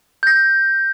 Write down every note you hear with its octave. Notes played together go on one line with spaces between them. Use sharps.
G6 A#6